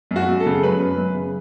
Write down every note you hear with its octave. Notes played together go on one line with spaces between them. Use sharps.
F#2
F#4
F#2
A4
C#3
F#3 B4
F#2
F#2
C#3